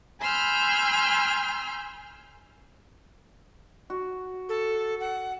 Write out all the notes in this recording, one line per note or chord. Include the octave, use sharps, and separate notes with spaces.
G#5 B5 C6 E6 F6 G6
F#4
A4
F#5